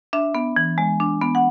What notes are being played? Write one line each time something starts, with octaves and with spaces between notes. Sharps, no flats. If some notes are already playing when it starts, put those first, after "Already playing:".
D4 E5
B3
E3
G#3
D4
B3
F#5